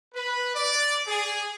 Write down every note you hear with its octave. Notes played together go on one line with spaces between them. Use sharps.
B4
D5
G#4